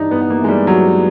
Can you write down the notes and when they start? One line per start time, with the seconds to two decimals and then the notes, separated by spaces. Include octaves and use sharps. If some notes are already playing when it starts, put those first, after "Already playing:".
Already playing: G2 E3 D4 D#4
0.11 G2 B3
0.21 B3
0.30 A#3
0.40 E3 G#3
0.48 G3
0.67 G2 F#3